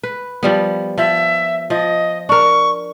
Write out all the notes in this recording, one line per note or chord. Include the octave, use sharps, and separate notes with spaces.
B4
F3 G3 B3
F3 E5
F3 D#5
D4 A#4 C#6